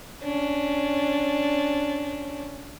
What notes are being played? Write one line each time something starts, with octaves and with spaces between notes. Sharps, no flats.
C#4 D4